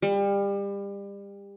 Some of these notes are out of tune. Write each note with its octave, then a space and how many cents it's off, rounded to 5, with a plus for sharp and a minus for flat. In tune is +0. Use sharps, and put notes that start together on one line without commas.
G3 +30